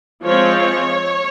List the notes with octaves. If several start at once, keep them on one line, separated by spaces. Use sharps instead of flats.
F3 G#3 C4 C#5
C#5